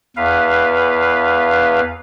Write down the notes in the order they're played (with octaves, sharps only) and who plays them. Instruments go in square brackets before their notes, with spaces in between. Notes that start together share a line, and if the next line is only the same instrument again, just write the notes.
[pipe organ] E2 B4 F5